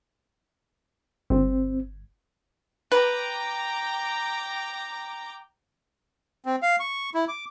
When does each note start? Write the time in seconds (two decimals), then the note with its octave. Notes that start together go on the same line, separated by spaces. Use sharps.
1.30 G1 C4
2.92 B4 G5 A#5 D6
6.46 C4
6.63 F5
6.80 C#6
7.14 E4
7.28 D6